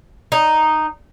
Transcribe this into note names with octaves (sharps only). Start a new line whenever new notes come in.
D#4